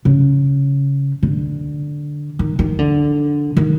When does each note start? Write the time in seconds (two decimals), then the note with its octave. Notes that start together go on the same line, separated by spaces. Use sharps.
0.05 C#3
1.23 D3
2.39 D#3
2.59 D#3
2.79 D3
3.57 D#3